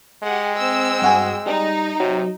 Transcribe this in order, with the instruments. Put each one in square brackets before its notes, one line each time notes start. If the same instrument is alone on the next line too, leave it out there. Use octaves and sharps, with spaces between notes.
[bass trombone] G#3 [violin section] G4 G#4 F#5
[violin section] C4 G5 E6
[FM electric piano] G2 F#4 G#4
[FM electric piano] G3 [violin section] D#4
[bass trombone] C3 [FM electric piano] F#3